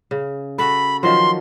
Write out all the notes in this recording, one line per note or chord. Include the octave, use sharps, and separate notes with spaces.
C#3
F#4 A4 B5
D#3 F3 F#3 C6